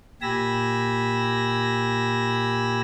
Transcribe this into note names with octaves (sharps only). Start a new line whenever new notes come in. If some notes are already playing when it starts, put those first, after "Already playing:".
A#2 G4 G#5 B5 E6 A#6